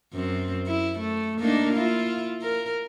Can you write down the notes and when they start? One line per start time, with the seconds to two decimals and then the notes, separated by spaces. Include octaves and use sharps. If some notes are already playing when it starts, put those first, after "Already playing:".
0.14 F#2 C4
0.67 E4
1.00 A3
1.40 A#3 D4 D#4
1.74 E4 F4
2.42 A#4